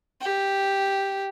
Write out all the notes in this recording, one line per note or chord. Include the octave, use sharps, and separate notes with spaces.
G4